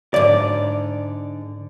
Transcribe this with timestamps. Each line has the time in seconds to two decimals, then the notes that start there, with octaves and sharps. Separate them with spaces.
0.14 G#2 D3 D5